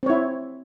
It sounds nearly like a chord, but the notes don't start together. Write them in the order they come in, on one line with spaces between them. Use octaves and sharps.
C4 C#5 E4